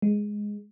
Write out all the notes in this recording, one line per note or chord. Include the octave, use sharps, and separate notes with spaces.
G#3